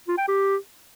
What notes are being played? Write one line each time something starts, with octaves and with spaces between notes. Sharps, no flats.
F4
G5
G4